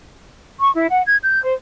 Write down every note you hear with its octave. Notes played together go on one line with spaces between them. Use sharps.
C#6
E4
F#5
G#6
G6
C5